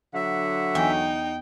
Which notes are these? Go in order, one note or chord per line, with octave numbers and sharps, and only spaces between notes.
D3 F#3 E5 F#5
E2 D#4 G5